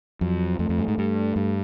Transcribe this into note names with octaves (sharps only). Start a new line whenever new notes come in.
F2 F#3
F2 A3
F2
G2
G#2
G2
G2